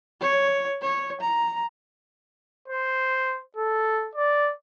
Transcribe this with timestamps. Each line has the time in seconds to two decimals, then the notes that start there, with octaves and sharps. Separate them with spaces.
0.21 C#5
0.82 C#5
1.21 A#5
2.68 C5
3.56 A4
4.16 D5